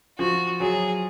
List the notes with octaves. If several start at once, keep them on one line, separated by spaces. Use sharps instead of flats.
F3 F#4
F#3 G#4